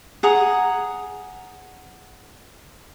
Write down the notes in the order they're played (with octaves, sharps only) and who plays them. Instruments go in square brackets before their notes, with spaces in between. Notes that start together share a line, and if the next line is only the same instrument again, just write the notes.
[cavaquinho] G#4 F#5 A#5 D#6